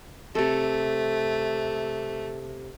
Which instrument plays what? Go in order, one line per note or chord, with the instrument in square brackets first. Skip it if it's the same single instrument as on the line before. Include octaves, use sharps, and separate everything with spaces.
[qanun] C3 A4 [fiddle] A3